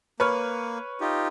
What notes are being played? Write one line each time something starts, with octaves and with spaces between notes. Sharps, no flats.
A#3 B4 C#5 F6
D#4 F4 G4